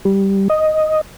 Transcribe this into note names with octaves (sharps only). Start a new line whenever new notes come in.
G3
D#5